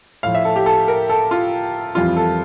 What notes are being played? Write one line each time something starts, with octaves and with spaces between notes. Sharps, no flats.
A2 F3 F5
E5
A4
G4
A4
A#4
A4
F4
F2 E3 G3 F4
A4